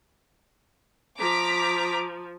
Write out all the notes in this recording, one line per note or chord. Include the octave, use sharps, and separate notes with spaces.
F3 A#5 D6 B6